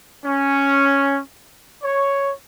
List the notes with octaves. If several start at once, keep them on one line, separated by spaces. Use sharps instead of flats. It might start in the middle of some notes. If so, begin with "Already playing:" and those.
C#4
C#5